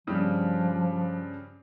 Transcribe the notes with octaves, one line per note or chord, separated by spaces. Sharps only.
G2 C#3 F3 G3